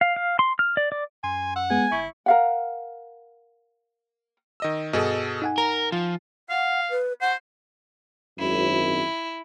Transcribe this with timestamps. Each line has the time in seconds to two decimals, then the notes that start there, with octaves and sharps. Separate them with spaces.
0.01 F5
0.16 F5
0.39 C6
0.59 F6
0.77 D5
0.92 D5
1.24 F#2 G#5 C6
1.56 F#5 E6
1.70 G#3 B3 G#4 G#5
1.92 G1 E4 C#6
2.26 A#4 F5 F#5
4.60 D#3 D#5 E6
4.93 G2 B2 G#4 A4 D#5
5.42 D#4 F#5 G#5
5.58 A#4 A#5
5.92 F3 F4
6.49 F5 F#5
6.90 B4
7.21 C5 F#5
8.39 G#1 F#2 E4